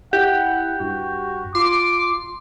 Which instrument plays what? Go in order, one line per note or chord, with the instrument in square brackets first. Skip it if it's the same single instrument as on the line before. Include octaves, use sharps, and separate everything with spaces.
[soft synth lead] E4 [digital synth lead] G4 [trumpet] F#5
[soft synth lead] G2 [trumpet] F#4
[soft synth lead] F4 [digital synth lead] C6 [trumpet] D6